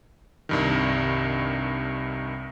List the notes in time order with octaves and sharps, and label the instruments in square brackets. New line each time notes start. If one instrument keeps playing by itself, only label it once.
[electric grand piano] C2 G2 D#3